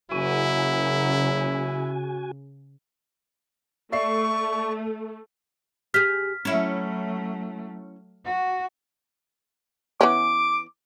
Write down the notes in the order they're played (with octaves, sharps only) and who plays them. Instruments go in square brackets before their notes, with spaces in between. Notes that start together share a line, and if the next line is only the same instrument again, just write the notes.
[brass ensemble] F#1 F#3 [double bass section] C#3 [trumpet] E4 [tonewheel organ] F#4 G#5
[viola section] A3 [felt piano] D5 E5 C7 [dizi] C#6
[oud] G4 G#4 [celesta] F6 B6
[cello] F#3 A3 [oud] C#4 E4
[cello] F#4
[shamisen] E3 B3 C#4 [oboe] D6